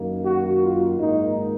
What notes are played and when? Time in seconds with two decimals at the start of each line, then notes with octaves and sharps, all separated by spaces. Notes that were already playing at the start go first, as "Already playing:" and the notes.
Already playing: F#2 D#3 A#3
0.24 F#4
0.61 F4
0.98 G#2 D#3 A#3 D#4